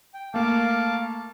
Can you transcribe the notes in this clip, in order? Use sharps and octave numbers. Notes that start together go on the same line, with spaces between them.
G5
A3 A#3 F5 A5 D6